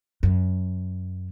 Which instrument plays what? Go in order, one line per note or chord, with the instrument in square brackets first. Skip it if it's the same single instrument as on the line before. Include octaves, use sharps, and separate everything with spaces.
[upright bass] F#2